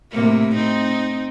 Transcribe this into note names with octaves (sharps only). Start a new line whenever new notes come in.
A2 C3 A#3
C4 D#4